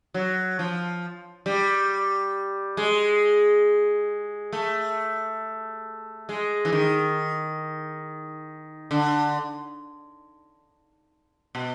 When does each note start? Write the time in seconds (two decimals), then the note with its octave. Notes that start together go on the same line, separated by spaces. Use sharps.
0.14 F#3
0.59 F3
1.46 G3
2.77 G#3
4.53 A3
6.29 G#3
6.65 E3
6.73 D#3
8.91 D3
11.55 B2